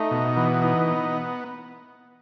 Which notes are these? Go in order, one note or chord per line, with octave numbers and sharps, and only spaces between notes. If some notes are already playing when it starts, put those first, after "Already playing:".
Already playing: A3 D#4
B2
E3 B3
D#4
B3